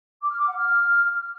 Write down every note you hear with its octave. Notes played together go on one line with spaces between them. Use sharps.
D6
F6
D6
F#5
F6